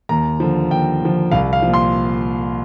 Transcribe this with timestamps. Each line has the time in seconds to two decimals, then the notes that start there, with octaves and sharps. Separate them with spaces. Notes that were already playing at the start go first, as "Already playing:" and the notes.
0.09 D#2 A#5
0.40 D3 F3
0.71 D#2 G5
1.02 D3 F3
1.31 C2 F5
1.53 F5
1.62 F3
1.67 A#2
1.74 C6